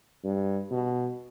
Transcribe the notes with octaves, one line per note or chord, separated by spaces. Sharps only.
G2
B2